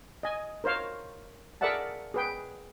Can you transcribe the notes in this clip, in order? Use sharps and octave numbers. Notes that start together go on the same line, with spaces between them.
D#5 G#5
A#4 C5 C#5 F5
G#4 A#4 D5 E5 F#5 A5
G#4 B4 G5